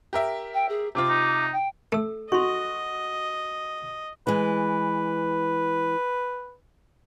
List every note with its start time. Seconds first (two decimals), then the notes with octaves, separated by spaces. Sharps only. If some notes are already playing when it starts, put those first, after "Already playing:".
0.13 G4 A#4 E5
0.54 G5
0.69 G#4
0.95 C3 C4 F4 D6
1.09 D#4
1.52 G5
1.92 A3 A4 E6
2.32 F#4 D#5 C6 C#6
4.27 E3 G#3 B4